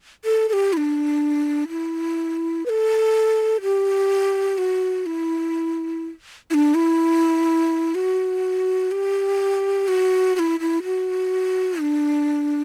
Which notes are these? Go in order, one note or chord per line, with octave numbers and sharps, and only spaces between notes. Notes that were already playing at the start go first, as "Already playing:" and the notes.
A4
A4
G4
E4
D4
E4
B4
A4
G4
F#4
E4
E4
D4
E4
F#4
G4
F#4
F#4
E4
E4
F#4
D4